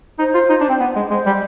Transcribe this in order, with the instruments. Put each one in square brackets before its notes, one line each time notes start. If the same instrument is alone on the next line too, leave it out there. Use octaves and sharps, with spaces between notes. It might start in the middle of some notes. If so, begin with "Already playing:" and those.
[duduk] D#4 [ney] C5
[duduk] F4
D#4
D4
C4
B3
G#3
[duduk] G#3 [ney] C5
[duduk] G3